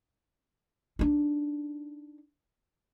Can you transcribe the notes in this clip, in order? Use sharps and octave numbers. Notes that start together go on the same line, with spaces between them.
D4 D#4